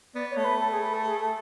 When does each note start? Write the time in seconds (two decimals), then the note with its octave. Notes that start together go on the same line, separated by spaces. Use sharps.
0.15 B3 D5
0.30 C#5
0.37 A3
0.44 B4
0.60 A4
0.72 G#4
0.83 B4
0.93 A4
1.06 G#4
1.20 A4